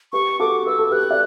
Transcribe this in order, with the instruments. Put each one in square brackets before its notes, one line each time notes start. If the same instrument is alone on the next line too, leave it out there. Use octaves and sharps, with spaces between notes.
[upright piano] G4 B4 [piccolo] C#6
[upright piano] F#4 A4 [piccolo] D6
[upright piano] B4 [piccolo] E6
[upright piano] A4
[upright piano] G4 B4 [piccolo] F#6
[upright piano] D5